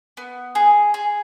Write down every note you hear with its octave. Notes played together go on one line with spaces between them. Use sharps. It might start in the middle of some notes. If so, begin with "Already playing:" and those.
B3
G#4
G#4